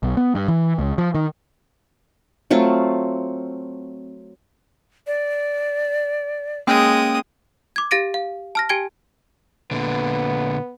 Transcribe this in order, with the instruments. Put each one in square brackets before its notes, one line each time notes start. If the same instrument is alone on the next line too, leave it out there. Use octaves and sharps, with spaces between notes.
[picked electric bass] B1
B3
G2
E3
C#2
F3
D#3
[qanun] F#3 A3 C4 F4
[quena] D5
[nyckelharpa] G#3 D#6 [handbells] A#3 C#4 G5
[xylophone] D6 G#6
G4 F5 A6 A#6 D7 D#7
F5
A5 F6 A#6
G4 G5 G#5 G#6 D7 G7
[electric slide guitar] A#2 D3 [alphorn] B3